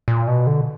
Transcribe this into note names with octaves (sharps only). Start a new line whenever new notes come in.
A#2
B2
D3